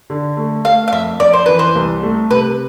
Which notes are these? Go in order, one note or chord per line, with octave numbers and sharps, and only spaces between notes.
D3
A3
A3 F5
F5
F2 E5
F2 D5
C5
E3 B4
C5
C2
A3
C3 B4